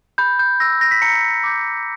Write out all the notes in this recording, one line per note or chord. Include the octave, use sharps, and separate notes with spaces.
B5 G6
G6
E6 G6 A#6
A#6
B6
A#5 C#7
D6 G6